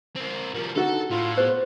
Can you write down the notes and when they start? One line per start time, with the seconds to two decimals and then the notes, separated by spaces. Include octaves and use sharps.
0.16 C4 A#4
0.55 F3 G3 A#4
0.76 D3 D#4 F#4 A4
1.11 A2 F4
1.37 B3 G#4 C5